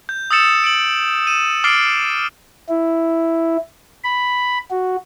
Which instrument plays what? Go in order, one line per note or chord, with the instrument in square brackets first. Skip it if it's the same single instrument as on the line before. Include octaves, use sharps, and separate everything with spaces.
[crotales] G6
D#6 E6 A6 C#7 E7
D7 F#7
D#7 E7
D6 F6 A6 C7 D7 F#7
[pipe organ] E4
B5
F#4